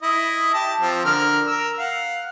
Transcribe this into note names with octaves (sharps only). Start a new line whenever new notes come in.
E4 D#5
G4 A5
F3 C4
D3 A#4 F6
A#4 E6
F5 F#5